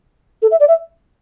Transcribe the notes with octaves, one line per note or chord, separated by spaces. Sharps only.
A4
E5
D5
E5